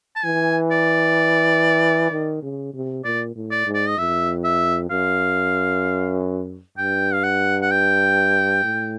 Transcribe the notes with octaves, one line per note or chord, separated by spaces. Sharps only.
A5
E3 G#5
D5
D#3
C#3
C3
A#2 D5
A2
D5
G#2
D5
D#5
F2 E5
E5
F#2 F5
G2 G5
F5
F#5
F#5
G5
A2